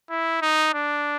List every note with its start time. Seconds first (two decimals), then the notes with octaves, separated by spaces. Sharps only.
0.10 E4
0.42 D#4
0.74 D4